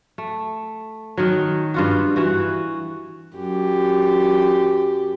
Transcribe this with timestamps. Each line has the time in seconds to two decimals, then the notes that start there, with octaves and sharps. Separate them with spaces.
0.18 A3
1.17 D#3 F#3
1.74 G2 F4 F#4
2.16 E3 F#4
3.36 F#2 G4